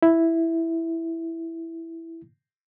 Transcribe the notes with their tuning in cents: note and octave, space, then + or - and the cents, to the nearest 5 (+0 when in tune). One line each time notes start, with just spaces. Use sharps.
E4 +0